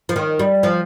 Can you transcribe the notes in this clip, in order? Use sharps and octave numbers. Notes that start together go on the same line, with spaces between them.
F3
D#3
G3
F3